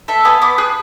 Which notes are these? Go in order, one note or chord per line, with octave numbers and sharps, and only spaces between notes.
A4 E5
B3 G#5
B3 D6
G#4 F#6